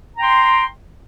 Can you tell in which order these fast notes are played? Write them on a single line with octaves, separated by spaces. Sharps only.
A#5 G5 C6